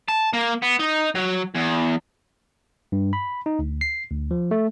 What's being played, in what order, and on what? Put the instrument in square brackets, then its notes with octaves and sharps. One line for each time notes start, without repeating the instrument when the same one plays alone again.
[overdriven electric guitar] A5
A#3
B3
D#4
F#3
E2
[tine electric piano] G2
B5
D#4
D2
C7
D2
F3
A3